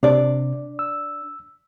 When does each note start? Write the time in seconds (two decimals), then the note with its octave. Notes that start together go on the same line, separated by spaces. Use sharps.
0.03 C3 D4 D5
0.79 E6